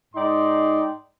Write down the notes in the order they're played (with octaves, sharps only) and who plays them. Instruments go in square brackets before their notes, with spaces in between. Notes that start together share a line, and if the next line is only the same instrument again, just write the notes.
[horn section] G#2 D#4 D5 G5 C6